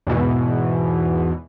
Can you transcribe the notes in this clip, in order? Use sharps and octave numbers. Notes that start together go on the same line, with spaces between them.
E2 G#2 B2 E3